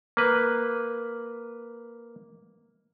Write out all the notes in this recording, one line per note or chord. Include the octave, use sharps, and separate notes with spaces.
A#3 B4